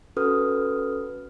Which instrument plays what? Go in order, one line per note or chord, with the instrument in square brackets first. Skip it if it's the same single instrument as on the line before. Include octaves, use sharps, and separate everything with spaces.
[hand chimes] C#4 F#4 A4 B4 D#6 F6